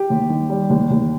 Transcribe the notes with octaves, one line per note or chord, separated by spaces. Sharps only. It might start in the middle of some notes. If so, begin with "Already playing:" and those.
Already playing: G4
D#2
D#3
G3
D#2
D#2